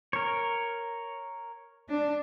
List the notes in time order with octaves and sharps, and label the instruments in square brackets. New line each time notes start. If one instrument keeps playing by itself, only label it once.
[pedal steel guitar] A#4 C#5
[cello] D4